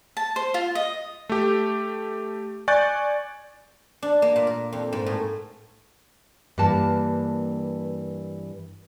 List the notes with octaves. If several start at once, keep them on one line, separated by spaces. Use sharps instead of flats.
A5
C5
F4
D#5
A3 G4
D5 G#5 C#6 F#6 G6 A6
D4
A#3
A#2
A#4
F2
G#2
A2
G2 E3 A#3 A5